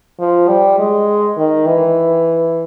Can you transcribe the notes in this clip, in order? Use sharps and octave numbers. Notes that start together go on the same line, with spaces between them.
F3
G3
G#3
D#3
E3